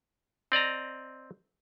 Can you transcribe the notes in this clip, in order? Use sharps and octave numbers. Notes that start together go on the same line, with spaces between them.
C4 D5 D#5 A#5